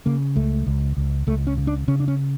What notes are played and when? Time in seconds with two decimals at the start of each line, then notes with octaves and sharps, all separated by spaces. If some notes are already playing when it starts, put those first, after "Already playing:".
0.06 C#3 A#3
0.36 C#2 A3
0.67 C#2
0.97 C#2
1.27 C#2 A3
1.47 C#4
1.57 C#3
1.67 D4
1.88 C#3 C#4
2.00 D4
2.08 C#4